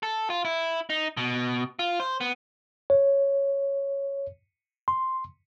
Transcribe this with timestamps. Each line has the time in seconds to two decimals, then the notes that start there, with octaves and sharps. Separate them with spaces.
0.03 A4
0.30 F4
0.45 E4
0.90 D#4
1.17 B2
1.79 F4
2.00 C5
2.21 B3
2.90 C#5
4.88 C6